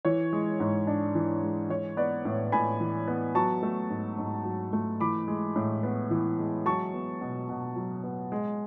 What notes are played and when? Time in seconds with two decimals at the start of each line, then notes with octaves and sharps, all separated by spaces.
0.05 E3 C#5
0.33 G#3
0.60 G#2
0.87 D4
1.15 E3
1.42 G#3
1.70 E3 C#5
1.97 B3 B4 D5
2.25 A2
2.52 A2 G#5 B5
2.80 E3
3.07 B3
3.35 F#3 A5 C#6
3.63 A3
3.90 G#2
4.18 G#2
4.45 F#3
4.73 A3
5.00 E3 B5 D6
5.28 G#3
5.56 A2
5.83 B3
6.11 E3
6.39 G#3
6.66 F#3 A5 C#6
6.94 B3
7.21 B2
7.49 B2
7.76 F#3
8.04 B3
8.32 G#3